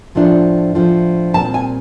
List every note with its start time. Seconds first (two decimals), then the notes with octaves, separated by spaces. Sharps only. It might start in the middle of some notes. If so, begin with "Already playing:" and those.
0.15 A2 F3 A3 D4
0.75 A2 F3 A3 D4
1.34 A#2 G3 C4 A5
1.54 G#5